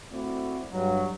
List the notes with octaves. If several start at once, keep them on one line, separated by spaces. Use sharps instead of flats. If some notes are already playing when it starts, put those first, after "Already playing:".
A3 C4 E4 F#4 D5
G2 F#3